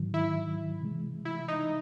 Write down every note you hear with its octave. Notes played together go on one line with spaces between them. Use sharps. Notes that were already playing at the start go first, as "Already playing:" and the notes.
Already playing: G#2 D#3 F#3
E4
C3 E3 G#3
E4
D#4